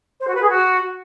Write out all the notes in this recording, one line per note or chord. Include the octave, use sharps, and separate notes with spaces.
C5
F#4
B4
G#4
F#4